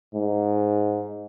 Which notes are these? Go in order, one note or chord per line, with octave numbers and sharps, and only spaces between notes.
G#2